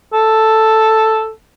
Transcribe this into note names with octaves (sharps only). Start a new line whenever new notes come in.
A4